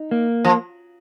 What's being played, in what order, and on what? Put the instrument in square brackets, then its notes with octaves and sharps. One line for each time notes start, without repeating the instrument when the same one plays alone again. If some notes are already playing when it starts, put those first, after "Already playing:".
Already playing: [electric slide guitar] D#4
A#3
[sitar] F3